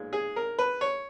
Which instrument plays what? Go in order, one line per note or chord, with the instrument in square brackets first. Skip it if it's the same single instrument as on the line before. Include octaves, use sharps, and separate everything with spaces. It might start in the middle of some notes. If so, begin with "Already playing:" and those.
Already playing: [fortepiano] B1 A#2 G#3
G#4
A#4
B4
C#5